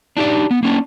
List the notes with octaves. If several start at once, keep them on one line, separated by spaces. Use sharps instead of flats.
D4 D#4 G4 D5
B3
A#3 C#4 D4